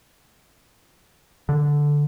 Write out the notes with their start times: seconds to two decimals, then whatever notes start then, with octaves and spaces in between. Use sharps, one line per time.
1.49 D3